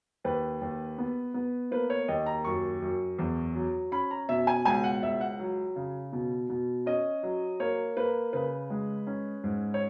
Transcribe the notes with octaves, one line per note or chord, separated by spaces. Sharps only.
D#2 B4
D#2
B3
B3
A#3 B4
C#5
D#2 D#5
A#5
F#2 C#6
F#2
E2
F#3
C#4 B5
A#5
B2 E5
G#5
C#2 G#5
F#5
C#2 E5
F#5
F#3
C#3
B2
B2
C#4 D#5
F#3
A#3 C#5
A#3 B4
C#3 B4
G#3
C#4
G#2
C#5